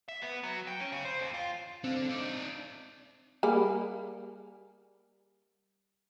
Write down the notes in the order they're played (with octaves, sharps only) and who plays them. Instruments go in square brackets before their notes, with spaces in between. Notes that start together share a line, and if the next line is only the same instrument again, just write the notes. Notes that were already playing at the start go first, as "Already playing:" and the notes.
[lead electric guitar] E5
B3
F#3
G5
C#4
C#3
C5
D#2
F4
[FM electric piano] C4 F5 [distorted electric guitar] D4 A4
[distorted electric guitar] D#4 D5
[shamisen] G3 A#3 G#4